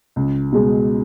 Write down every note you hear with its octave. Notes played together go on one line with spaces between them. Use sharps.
C#2
B2 G#3